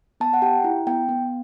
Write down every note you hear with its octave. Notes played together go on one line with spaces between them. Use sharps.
B3 A5
F#5
G4 G5
E4
B3 G5
B3